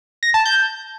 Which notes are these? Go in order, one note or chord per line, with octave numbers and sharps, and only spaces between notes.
A#6
A5
G6